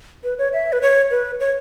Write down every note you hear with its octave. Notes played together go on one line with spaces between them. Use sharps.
B4
C#5
E5
B4
C#5
B4
C#5